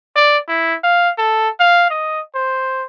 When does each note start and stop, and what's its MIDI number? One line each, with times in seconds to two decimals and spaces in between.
0.16 0.37 74
0.48 0.76 64
0.83 1.10 77
1.18 1.49 69
1.60 1.88 77
1.90 2.20 75
2.35 2.86 72